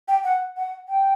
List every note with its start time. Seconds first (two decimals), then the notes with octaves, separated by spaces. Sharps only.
0.08 G5
0.24 F#5
0.57 F#5
0.88 G5